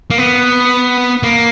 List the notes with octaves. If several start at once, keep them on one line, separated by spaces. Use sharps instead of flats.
A#3
B3
A#3